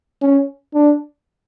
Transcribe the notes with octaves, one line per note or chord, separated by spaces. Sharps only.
C#4
D4